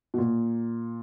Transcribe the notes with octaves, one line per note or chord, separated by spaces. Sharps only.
B2
A#2